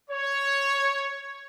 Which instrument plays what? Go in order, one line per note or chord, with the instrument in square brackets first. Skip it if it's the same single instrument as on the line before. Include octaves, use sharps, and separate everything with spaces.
[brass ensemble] C#5